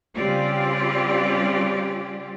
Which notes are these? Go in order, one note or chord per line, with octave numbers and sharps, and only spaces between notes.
C#3 G3 C4 F4 G4 D5